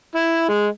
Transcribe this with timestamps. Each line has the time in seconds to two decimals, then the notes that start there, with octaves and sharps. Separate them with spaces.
0.15 E4
0.48 G#3